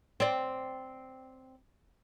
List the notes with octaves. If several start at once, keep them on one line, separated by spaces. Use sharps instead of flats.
C4 D5